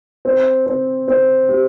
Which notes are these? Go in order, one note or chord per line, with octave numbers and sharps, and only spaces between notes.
C4
C4
C4
G4